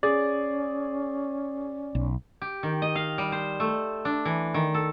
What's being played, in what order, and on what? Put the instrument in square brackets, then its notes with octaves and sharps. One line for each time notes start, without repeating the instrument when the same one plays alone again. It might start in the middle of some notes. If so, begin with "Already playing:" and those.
[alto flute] C#4 [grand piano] G#4 [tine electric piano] D5
[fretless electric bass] B1
[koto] G4
D#3
D#5
F5
G3
C5
A3
D4
E3
D#3
A4